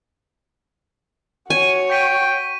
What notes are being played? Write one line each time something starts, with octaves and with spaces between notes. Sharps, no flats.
F#4 C#5 G#5
G5 C#6 B6 D#7